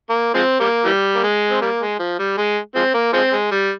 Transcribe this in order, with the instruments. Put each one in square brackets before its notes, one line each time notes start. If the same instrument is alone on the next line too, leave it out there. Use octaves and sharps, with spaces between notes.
[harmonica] A#3
F3 G#3 C4
G3 A#3
E3 G3
A#3
G#3
C4
G3 A#3
G#3
F3
G3
G#3
F3 G#3 C4
A#3
F3 G#3 C4
G#3
G3